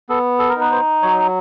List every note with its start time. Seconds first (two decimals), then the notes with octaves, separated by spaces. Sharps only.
0.09 B3 A4
0.39 A4
0.49 A#4
0.56 D#4 B4
0.71 C5
1.03 F#3 C#5